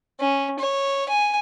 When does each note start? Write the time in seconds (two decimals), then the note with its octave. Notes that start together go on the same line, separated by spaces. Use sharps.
0.20 C#4
0.59 C#5
1.09 G#5